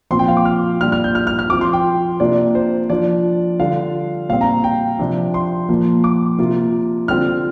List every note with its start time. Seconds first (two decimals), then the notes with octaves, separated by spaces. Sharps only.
0.10 A#2 F3 C4 F4 C6
0.19 G5
0.28 F5
0.37 D6
0.45 F6
0.81 A#2 G3 D4 F4 F6
0.92 F6
1.04 G6
1.15 F6
1.27 F6
1.39 F6
1.50 F3 C4 F4 D6
1.61 C6
1.73 G5
2.20 C3 A#3 D4 F4 D5
2.55 C5
2.90 F3 D4 F4 D5
3.60 D3 G3 D4 F4 F5
4.29 A#2 G3 C4 F5
4.41 A#5
4.64 G5
4.99 C3 F3 D4
5.34 C6
5.69 A#2 F3 A#3 F4
6.04 D6
6.38 C3 A#3 F4
7.08 D3 G3 C4 F4 F6